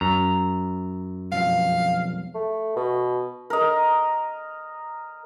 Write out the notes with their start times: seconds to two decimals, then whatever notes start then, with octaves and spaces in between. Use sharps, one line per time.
0.01 F#2 A#5
1.32 B1 F2 F5
2.34 A3
2.76 B2
3.50 A#4 D#5